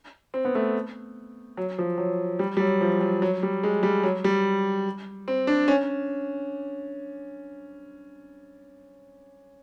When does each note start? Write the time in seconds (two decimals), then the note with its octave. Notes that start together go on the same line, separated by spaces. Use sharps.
0.34 C4
0.45 B3
0.55 A3
1.57 F#3
1.78 F3
1.98 F#3
2.39 G3
2.57 G3
2.60 F#3
2.81 F3
3.01 F#3
3.22 F#3
3.43 G3
3.63 G#3
3.83 G3
4.03 F#3
4.24 G3
5.28 C4
5.47 D4
5.68 C#4